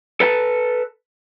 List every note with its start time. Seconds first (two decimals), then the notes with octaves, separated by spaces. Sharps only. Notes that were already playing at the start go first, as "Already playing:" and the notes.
0.20 A4 B4 F#5 A5